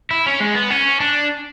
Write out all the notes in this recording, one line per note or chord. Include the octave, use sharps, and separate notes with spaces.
E4
C#4
G#3
B3
C#4
D4